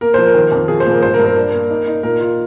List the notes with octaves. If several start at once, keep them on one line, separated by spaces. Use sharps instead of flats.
A#3 A#4
F3 C5
A#4
D#3
F2
F3 G#4
C5
A#2
A#4
G2 C5
A#4
G2
A#4
D4
A#3
D#4
D#4
A#2 A#4
F4